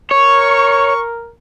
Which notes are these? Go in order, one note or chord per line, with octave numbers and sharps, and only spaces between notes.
A#4 C#5 C#6